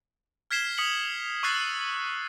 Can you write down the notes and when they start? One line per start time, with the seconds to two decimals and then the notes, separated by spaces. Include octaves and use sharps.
0.51 F6 G#6 B6 C7 E7 G7
0.78 D#6 B6 C#7 F#7
1.43 C#6 D#6 E6 F#6 A6 C7